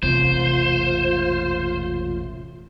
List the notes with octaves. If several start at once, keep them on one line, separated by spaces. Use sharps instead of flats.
E1 A1 C3 F4 C5